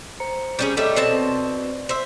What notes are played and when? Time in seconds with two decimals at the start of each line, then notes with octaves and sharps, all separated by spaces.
0.20 C5 A#5 C#7
0.59 G3 C#4 G#4
0.77 G3 A3 G4 A4 C#5 D#5
0.96 B2 C4 D5 A5
1.89 C5 E5